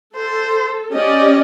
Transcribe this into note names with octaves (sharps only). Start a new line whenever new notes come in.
A4 C5
C#4 G4 D5 D#5